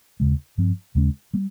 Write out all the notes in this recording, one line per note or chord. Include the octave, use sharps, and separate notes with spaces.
D#2 C#3 G#3
G2 F3 C4
D#2 C#3 G#3 C#4
G3 A#3